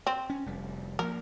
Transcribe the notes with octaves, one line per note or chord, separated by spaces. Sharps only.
C4
C#4
F1 G3
F3 F#3 A#3 A#4